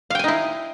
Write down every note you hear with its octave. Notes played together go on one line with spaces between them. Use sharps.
D#4 E4 F5 G5 G#5